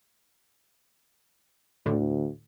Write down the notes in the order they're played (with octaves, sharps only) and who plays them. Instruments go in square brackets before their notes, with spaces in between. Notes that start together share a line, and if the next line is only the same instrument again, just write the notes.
[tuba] D2 [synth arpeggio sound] A2 D3